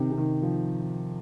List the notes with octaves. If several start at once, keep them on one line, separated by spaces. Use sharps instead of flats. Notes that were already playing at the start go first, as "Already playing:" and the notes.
Already playing: C3 D#3
C3
D#3
F3